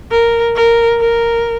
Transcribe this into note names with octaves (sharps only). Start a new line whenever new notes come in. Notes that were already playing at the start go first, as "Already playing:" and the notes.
A#4
A#4
A#4